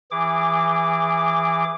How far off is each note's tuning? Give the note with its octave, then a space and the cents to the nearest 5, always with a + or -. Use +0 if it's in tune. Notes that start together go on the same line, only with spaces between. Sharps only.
E3 +10 G#4 -20 D6 +0